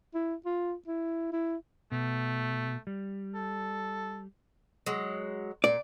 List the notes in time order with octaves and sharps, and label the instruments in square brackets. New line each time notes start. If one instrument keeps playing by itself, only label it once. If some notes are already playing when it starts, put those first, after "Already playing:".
[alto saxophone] E4
F4
E4
E4
[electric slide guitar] B2 [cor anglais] A3
[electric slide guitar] G3
[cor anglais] A4
[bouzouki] F#3 G#3
[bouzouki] A#2 [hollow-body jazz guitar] D5